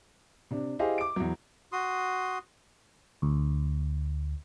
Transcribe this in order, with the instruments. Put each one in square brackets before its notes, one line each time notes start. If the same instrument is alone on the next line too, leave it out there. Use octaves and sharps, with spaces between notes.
[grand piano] C3 D4
E4 G4 G#4 C5 D#5 F5
D6 D7
E2 F#3
[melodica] F#4 C6 D#6
[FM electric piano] D2